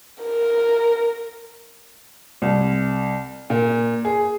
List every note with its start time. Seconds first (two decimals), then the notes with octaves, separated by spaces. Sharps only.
0.23 A#4
2.42 C2
3.50 A#2
4.05 G#4